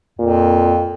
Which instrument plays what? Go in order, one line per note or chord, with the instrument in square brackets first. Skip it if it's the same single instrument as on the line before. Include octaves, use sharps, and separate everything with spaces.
[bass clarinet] F2 [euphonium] A#2